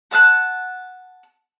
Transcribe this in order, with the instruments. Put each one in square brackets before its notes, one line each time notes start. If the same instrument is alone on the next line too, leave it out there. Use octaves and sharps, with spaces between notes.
[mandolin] F#5 A5 F6 F#6